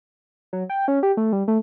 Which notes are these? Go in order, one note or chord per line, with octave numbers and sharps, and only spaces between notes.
F#3
G5
C#4
G4
A3
G3
A3